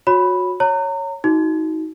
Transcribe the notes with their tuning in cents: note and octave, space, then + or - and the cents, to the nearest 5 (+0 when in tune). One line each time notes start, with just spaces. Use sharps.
F#4 -25 C#5 +0 B5 -5
C#5 +0 A#5 -30
D#4 +30 F#4 +0